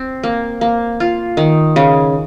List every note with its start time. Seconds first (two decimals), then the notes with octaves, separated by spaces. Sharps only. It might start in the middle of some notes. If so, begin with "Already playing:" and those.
Already playing: C4
0.23 A#3
0.61 A#3
1.00 F4
1.37 D#3
1.76 C#3